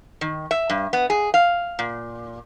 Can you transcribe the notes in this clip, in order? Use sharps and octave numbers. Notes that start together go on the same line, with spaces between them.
D#3
E5
G2
B3
G#4
F5
A#2